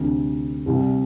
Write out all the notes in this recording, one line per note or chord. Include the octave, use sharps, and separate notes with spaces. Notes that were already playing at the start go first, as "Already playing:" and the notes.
Already playing: D2 C3 E3
C2 C3 G3